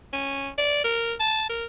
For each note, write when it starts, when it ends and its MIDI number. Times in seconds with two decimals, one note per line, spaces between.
0.13 0.50 61
0.58 0.83 74
0.84 1.14 70
1.20 1.45 81
1.50 1.65 70